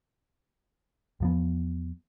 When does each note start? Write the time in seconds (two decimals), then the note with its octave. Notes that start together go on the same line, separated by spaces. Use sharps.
1.20 E2 F3 B3